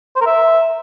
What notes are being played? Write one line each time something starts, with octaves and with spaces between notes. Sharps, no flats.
C5
A#4
E5